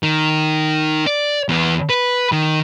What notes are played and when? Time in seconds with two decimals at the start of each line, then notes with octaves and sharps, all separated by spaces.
0.03 D#3
1.07 D5
1.49 E2 B3
1.89 B4
2.32 D#3